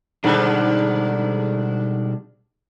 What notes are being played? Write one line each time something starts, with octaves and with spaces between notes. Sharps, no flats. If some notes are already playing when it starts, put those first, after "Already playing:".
G#2 B2 D3 D#3 G3 D4